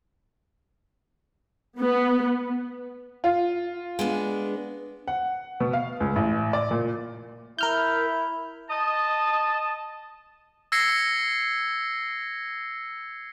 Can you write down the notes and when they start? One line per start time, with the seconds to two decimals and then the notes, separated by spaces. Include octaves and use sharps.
1.81 B3
3.24 F4
3.99 G#3 B3 D4
5.08 F#5
5.60 B2
5.73 F5
6.00 C#2
6.16 A1
6.53 D5
6.71 A#2
7.59 E4 A#4 F6 G6
8.71 D#5 A5
10.72 E6 G#6 A#6 C7 C#7